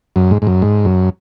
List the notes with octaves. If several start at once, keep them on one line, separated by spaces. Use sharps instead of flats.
F#2
G#2
G#2
F#2
G#2
F#2